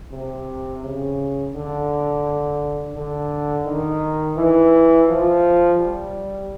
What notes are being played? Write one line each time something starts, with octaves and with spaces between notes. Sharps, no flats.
C3
C#3
D3
D3
D#3
E3
F3
G3